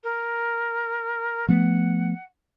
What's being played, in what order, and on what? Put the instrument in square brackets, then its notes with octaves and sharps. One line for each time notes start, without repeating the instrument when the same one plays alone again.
[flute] A#4
[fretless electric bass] F3 A3 B3 [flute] F#5